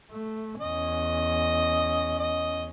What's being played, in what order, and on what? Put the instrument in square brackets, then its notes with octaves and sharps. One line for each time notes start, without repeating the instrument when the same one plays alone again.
[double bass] A3
[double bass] E2 C#4 [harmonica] D#5
[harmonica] D#5